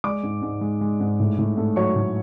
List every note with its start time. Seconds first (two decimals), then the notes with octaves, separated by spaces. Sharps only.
0.04 G#3 D5 D6
0.23 G#2
0.42 G#2
0.61 G#3
0.81 G#3
1.00 G#2
1.20 A2
1.38 A2
1.57 A3
1.76 F#3 C#5 C#6
1.95 A2